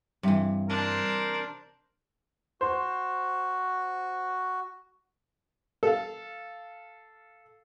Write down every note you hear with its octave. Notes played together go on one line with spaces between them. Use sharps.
G2 C3 E3
D4 A#4 C5
F#4 C5
A4 F5